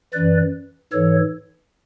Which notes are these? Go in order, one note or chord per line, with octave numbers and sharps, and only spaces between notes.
F#2 E3 B4 D5
G#2 E3 A4 C#5